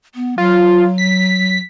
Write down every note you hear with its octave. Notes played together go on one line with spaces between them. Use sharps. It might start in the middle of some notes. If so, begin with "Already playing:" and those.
B3
F#3 F4
B6